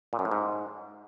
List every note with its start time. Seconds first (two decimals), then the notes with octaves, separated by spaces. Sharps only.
0.13 A#2
0.19 F#2
0.25 A2
0.31 G#2